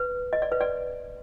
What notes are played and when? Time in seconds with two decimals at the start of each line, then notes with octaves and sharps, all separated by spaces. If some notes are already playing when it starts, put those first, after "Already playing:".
Already playing: B4
0.33 D#5
0.42 D5
0.52 B4
0.61 D5